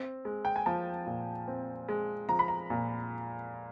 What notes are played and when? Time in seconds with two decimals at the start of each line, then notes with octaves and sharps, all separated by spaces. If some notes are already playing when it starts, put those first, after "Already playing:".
Already playing: C4
0.25 G#3
0.45 G5
0.56 G#5
0.66 F3 A5
1.07 A#2
1.48 C4
1.89 G#3
2.29 F3 A#5
2.39 B5
2.48 A#5
2.70 A#2